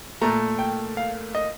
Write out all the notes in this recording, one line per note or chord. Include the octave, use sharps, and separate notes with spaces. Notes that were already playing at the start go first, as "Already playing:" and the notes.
A#2 A3 A#5
G5
F5
D#5